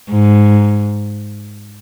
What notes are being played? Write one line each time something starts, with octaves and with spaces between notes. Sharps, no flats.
G#2